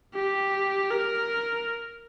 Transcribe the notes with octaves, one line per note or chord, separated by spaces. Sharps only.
G4
A#4